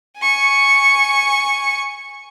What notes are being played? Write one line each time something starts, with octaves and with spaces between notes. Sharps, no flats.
G#5 C#6